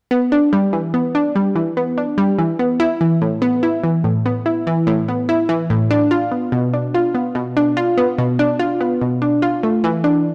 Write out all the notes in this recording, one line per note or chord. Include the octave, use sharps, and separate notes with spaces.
B3
D4
G3
E3
B3
D4
G3
E3
B3
D4
G3
E3
B3
E4
E3
A2
B3
E4
E3
A2
B3
E4
E3
A2
B3
E4
E3
A2
D4
F4
B3
B2
D4
F4
B3
B2
D4
F4
B3
B2
D4
F4
B3
B2
D4
F4
A3
E3
D4